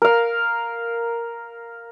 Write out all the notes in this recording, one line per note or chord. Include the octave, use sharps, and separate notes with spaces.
A#4 F5